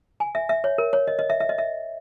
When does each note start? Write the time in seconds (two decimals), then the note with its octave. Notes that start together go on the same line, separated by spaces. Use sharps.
0.20 G#5
0.35 E5
0.49 E5
0.64 C#5
0.78 A#4
0.93 C#5
1.07 D#5
1.19 D#5
1.30 E5
1.40 E5
1.49 D#5
1.58 E5